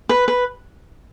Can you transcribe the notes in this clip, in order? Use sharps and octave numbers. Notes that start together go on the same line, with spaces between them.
B4
B4